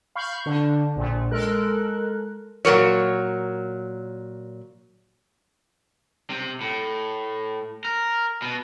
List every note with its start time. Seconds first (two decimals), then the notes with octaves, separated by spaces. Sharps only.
0.15 F5 B5 C#6 F6 G6
0.46 D3 D4
0.96 A#1 A#2
1.31 G#3 A4 A#4 F#6
2.65 A#2 F#3 A#4 C#5
6.30 C3
6.61 A2
7.85 A#4
8.42 B2